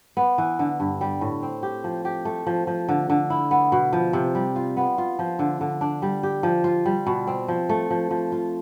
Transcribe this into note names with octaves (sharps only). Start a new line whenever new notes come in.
B3
E3
D3
G2
G3
A2
C4
G4
F3
G4
A3
F3
F3
D3
D3
E4
B3
B2
F3
C3
G3
F4
B3
F4
F3
D3
D3
D4
G3
G4
F3
F4
G3
B2
C4
F3
A3
F3
F3
F4